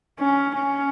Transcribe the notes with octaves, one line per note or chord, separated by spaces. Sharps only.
C#4
C#4